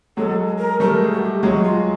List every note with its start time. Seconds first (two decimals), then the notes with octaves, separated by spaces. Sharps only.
0.17 F#3 G#3 A4
0.59 A#4
0.80 G3 A3 A#4
1.01 G#4
1.12 F#4
1.22 G4
1.43 F#3 G#3 F#4
1.64 F4